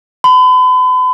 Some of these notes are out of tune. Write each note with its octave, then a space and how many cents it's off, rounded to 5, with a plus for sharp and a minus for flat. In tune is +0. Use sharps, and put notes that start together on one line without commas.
B5 +40